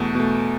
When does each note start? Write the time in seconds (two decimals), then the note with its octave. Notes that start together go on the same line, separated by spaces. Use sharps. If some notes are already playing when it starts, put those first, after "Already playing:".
Already playing: E2 B2 A3
0.15 B2 A3